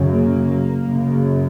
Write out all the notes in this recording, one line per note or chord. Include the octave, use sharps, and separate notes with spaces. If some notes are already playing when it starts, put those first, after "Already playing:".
Already playing: F#2 C#3
A#3
F#2 C#3